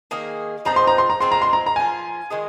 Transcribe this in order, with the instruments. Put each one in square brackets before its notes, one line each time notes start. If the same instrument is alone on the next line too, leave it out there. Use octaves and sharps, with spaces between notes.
[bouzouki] D#3 A#3 G#4
[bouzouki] F3 C4 D#4 C5 [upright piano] A#5
[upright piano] C6
A#5
C6
A#5
[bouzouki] G#3 C4 F4 [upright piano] C6
[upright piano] A#5
C6
A#5
A#5
[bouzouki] F3 A#3 F4 [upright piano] G#5
[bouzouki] D#3 G#3 F4 G#4